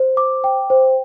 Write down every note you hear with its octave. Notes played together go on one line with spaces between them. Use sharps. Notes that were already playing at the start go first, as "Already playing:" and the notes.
Already playing: C5
D6
G5
C5